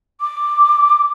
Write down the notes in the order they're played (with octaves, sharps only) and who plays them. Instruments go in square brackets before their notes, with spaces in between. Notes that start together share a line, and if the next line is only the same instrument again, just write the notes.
[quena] D6